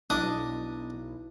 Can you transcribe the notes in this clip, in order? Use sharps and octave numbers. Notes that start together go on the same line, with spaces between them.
B1 D4 E4 D#5 D#6